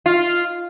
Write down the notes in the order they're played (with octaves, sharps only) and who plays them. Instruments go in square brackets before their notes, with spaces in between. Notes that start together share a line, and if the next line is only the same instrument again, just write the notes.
[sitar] F4